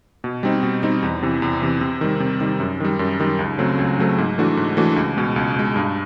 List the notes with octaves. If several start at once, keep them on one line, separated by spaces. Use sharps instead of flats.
B2
G3 C4 D#4
B2
G3 C4 D#4
E2
C3 E3
E2
C3 E3
C3
D#3 G3
C3
D#3 G3
F#2
D#3 G3
F#2
D#3 G3
C#2
C#3 F#3 A3 C4
C#2
C#3 F#3 A3 C4
G#2
E3 A3 D4 F#4
G#2
E3 A3 D4 F#4
C#2
B2 G#3
C#2
B2 G#3
G2